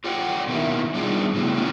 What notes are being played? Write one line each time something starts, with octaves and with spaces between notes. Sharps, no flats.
F4 G4 C#5 D5 F#5 G5
B2 D#3 A#3 E4
G3 B3 D4 D#4 F4 G#4
A2 C#3 B3 E4 F#4
A#3 B3 C#4 D4 F4